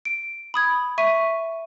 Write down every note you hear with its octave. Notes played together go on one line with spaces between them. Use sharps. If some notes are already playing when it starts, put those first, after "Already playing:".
D7
B5 D#6 G#6
E5 C#6 B6 D#7